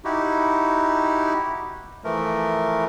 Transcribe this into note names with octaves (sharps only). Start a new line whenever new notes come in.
D#4 E4 F#4 G4
E3 F3 A3 A#4